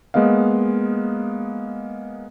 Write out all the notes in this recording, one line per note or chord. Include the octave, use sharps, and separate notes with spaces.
G#3 A#3 B3 D#5 F5